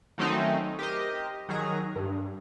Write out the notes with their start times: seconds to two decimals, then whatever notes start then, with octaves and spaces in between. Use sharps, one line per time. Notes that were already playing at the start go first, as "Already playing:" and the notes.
0.18 D#3 F#3 A3 C4 C#4 D#4
0.79 G4 A#4 C5 D#5
1.49 D#3 F#3 G#4 A#5
1.96 G2